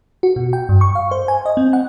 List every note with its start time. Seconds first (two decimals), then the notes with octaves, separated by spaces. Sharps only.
0.23 F#4
0.36 B2
0.53 G5
0.69 G2
0.81 C#6
0.95 F5
1.11 C5
1.28 G#5
1.46 D#5
1.57 C4
1.73 F#5